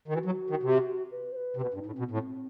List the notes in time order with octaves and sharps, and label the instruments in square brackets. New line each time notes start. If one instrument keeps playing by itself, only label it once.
[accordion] D#3
[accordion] E3 [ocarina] F#4
[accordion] F#3
D#3
C3
[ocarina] B4
C5
B4
[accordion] C3
[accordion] B2 [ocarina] B4
[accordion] G2
[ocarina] D#4
[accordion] A2
[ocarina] C4
[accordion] B2
[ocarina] B3
[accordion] A2 [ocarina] C4